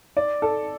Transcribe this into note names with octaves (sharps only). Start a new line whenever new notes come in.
D5
A4